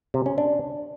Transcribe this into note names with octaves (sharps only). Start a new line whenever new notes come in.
C3
C#4
D4